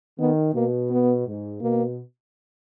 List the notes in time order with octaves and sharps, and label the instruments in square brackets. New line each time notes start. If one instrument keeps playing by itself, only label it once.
[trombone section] D#3 [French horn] B3
[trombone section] B2 [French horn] A#3
[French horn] B3
[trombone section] G#2
[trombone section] B2 [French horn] A#3